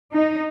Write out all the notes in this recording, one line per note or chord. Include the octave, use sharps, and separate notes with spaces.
D#4